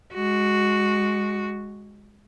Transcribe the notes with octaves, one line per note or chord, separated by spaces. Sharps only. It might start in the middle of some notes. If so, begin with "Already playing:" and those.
G#3 F#4